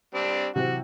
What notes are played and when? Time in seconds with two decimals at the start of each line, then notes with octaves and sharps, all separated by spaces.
0.15 G3 C4 D4
0.56 C3 E3 F#3 F#4